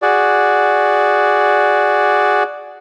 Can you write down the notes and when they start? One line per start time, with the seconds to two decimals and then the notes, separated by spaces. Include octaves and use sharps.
0.02 F#4 G#4 D5